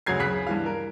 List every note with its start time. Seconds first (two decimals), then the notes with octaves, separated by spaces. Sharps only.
0.06 D2 C#3 F#3 G#6 C7
0.19 D1 C#3 B5 F#6 B6
0.47 G2 E3 F5
0.66 A#4